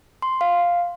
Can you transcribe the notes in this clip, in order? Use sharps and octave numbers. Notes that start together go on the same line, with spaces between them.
C6
F5